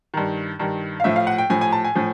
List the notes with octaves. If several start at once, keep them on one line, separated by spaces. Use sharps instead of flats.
G2 D#3
G2 D#3
F5
A2 F3 E5
F5
F#5
G5
A2 F3 G#5
G#5
A5
G#5
A2 F3